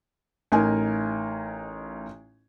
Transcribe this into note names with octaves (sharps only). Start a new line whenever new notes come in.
A1 D#4 A#4 G#5